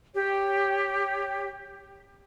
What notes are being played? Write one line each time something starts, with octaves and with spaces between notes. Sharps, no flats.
G4 C#5